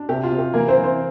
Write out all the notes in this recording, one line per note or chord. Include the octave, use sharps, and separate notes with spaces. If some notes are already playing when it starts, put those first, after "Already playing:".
Already playing: D4
C3 G4
F4
C3
G4
E3 A#3 A#4
C4 C5
E3
C4 C5